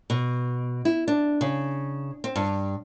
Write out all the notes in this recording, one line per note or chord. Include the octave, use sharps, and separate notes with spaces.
B2
E4
D4
C#3
C4
G2